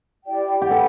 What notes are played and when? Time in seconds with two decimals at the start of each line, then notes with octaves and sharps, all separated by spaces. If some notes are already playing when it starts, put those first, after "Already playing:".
0.26 E4 G4 D5 G5
0.62 G4 B4 F#5 B5
0.71 A4